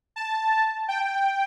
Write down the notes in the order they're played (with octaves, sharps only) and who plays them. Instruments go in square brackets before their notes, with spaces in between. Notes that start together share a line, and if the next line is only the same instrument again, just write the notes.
[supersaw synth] A5
G5